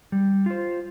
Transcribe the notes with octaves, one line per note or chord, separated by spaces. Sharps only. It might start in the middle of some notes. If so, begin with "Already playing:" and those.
G3
F4 C5